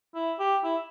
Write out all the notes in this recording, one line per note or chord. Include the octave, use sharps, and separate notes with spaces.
E4
G4
E4